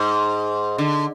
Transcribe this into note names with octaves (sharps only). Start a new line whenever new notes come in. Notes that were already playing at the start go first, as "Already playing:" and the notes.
Already playing: G#2
D3